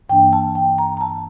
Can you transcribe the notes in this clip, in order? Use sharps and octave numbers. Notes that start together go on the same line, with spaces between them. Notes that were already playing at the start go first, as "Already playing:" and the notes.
G2 E3 A#3 D4 G5
A5
G5
A#5
A#5
A5